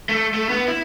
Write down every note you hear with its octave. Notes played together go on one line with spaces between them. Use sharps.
A3
A3
B3
E4